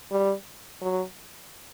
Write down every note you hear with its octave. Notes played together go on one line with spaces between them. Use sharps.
G3
F#3